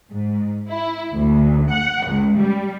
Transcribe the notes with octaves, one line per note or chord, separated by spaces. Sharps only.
G#2
E4
D2
F#5
C#2
G3